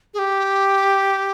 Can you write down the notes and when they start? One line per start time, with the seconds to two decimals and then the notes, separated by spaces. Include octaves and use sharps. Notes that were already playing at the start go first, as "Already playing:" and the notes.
0.14 G#4
0.19 G4